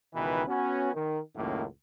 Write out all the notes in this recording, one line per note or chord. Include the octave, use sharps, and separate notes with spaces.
C#2 B2 D#3 E3 D#4 B4
B3 C#4 F#4
D#3
C#2 F#2 A2 D#3 A#3